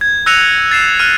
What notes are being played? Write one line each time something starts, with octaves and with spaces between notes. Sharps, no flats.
G#6
E6 F#6 A#6 C#7 D#7 F7
A6 C7 E7
F6 F#6 D#7